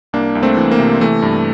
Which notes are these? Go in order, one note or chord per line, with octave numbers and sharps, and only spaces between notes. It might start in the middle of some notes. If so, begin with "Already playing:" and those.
C2 A#3 D4
C2
A3 C4
E3
A#3
C3
E3 A3
G2